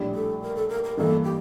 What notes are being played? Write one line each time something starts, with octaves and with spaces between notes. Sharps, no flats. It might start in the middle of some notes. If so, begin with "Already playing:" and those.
Already playing: A#1 A2 G3 D4
A4
A#4
A4
A#4
A#4
A1 G2 E3 A#3 A4
G4